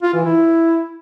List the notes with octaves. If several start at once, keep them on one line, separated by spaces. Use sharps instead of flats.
F4
E3
E4